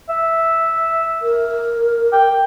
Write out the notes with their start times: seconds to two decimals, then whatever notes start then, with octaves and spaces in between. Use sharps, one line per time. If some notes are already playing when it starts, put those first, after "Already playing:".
0.09 E5
1.22 A#4
2.13 G5